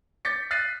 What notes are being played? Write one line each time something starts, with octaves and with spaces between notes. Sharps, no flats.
D6 G6 A6 B6 C#7
F6 F#6 A6 B6 C7 D#7